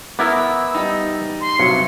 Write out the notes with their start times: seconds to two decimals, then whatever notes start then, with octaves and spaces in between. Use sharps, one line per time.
0.19 B3 E4 A#4 D6 E6
0.74 G3 D#4
1.41 C6
1.59 G2 C3 F#3 C#7